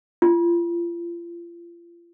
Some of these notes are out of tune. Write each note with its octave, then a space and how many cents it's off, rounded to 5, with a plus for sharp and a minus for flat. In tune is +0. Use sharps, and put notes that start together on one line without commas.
F4 -35